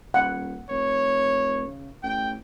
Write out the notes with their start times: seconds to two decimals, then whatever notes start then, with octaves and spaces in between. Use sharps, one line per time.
0.14 D#1 F#5
0.69 F1 C#5
1.67 C#3
2.03 A1 G5